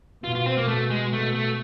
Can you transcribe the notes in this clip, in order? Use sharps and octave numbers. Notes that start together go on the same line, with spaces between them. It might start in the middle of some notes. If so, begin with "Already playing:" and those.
B2 F4
F4
C4
A#3
B2 A3
G#3
A3
A3